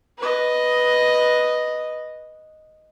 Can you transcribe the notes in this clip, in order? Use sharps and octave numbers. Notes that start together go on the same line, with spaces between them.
B4 D#5